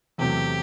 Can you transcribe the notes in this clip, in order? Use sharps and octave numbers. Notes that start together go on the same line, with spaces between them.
E2 C3 F#3 A3 G4